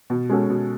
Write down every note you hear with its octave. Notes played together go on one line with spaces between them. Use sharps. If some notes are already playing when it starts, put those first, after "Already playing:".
B2
G#3 C#4 F#4 A4
B2